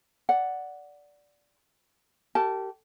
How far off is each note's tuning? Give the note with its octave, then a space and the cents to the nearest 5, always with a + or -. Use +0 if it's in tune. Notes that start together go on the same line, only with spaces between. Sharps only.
D5 -10 F#5 +0
G4 -25 A#4 -40 A5 +0